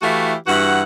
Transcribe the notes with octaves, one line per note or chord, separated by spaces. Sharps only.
E3 A3 E4 F#4 G4 F5
G2 E3 E4 F#4 F#5